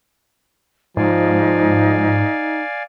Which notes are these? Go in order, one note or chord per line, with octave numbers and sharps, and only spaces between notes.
G#2 F3 D#4 D5 F5 G#5